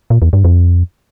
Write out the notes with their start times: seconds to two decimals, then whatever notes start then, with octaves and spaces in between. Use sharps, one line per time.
0.10 A#2
0.22 E2
0.33 G2
0.44 F2